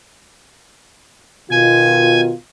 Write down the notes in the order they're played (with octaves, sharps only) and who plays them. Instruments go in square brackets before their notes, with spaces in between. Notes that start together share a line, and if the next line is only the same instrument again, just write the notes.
[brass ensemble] B2 D#3 F4 [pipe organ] G#5